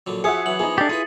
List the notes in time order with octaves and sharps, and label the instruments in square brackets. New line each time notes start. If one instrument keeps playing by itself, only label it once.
[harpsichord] A#1 D3 F#3
[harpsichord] F3 F#4 [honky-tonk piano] G#4 E5 F#5 [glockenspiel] D#6 C#7
[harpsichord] E3 F#3 [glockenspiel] F#7
[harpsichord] E3 F3 B3 [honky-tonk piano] D#4 G#4
[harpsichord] A3 [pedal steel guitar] D4 G4 [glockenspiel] A6
[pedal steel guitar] E4 G#4 [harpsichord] F4 B4 [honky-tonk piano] D#7